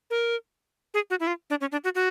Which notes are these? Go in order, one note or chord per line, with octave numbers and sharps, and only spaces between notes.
A#4
G#4
F#4
E4
F4
D4
C#4
D4
F#4
F#4